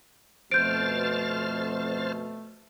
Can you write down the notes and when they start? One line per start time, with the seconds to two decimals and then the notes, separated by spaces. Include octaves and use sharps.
0.51 F2 B2 A3 C5 F6 G6 A6 D7